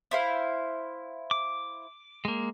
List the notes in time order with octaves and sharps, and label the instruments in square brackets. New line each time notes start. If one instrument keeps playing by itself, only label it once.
[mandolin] E4 C5 F5
[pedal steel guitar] D6
G#3 A#3